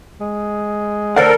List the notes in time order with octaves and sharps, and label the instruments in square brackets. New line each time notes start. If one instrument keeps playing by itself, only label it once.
[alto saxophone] G#3
[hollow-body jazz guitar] D2 D5 F#5 [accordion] A4 A#4 [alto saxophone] C5